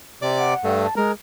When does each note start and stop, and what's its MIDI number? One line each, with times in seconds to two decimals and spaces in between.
0.22 0.54 48
0.22 0.54 74
0.22 0.54 86
0.39 0.73 78
0.64 0.87 43
0.64 0.87 57
0.85 0.94 81
0.97 1.12 56
0.97 1.12 70